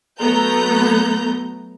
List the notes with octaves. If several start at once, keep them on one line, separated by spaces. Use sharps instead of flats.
F#3 A3 B3 A#5 G6